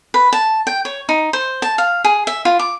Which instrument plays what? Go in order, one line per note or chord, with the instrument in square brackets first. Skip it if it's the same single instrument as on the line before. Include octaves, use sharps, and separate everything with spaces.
[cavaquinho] B4
A5
G5
C#5
D#4
C5
A5
F5
G#4
E5
F4
D6